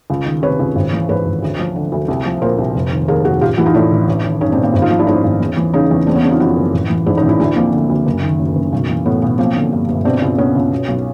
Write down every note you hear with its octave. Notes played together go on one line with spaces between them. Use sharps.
C#2
D#3
C3 B4 C#5
C#2
G#1
E3
G#2 B4 C#5
G#1
D2
F3
D3
D2
C2
F3
A#2 A#4 C5
C2
F1
D#3
D#2 G#4 A#4
F1 F#4 G#4
A1 F4 G4
E3 E4 F#4
D#4 F4
A2 D4 E4
A1
A1
D#3
G2 C#4 D#4
C4 D4
A1
A#3 C4
G#1
D#4 F4
F3
D4 E4
G#2 C#4 D#4
G#1
E2
E3
C#3 C#4 D#4
E2
E3 C4 D4
B3 C#4
C#3 C4 D4
D#4 F4
F2 E4 F#4
F#1
A1
E3
G#2 D4 E4
C#4 D#4
A1
D4 E4
D2 D4 E4
F3 A#3 C4
D3
D2
F#1
D#3
F#2
F#1
B1
E3
A2 B3
B1 B3
F3 A#3 C4
D3
G2
G1
B2 C4 D4
C#2
B2 B3 C#4
C#2
B2
B1